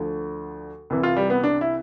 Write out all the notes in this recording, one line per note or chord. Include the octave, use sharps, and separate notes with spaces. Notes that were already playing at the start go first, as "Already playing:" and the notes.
Already playing: D2 D3 F3
C2 C3 E3
F4
G3
B3
D4
E4